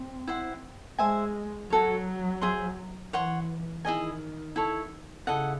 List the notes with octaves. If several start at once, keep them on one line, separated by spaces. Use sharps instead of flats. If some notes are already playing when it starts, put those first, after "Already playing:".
Already playing: C4
E4 C5 F#5
G#3 C5 E5 G#5
F#3 F#4 A4 C#5
G#4 C5 E5 C6
E3 C#5 F#5 C6
D#3 E4 G#4 D#5 G#5
E4 A4 C#5
C#3 E4 A4 D#5 F#5